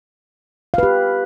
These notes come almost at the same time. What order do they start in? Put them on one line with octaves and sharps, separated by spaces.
F5 B4 G4